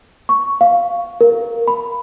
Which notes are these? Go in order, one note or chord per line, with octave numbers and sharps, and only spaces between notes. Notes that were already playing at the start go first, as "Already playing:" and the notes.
C#6
F5
A#4
B5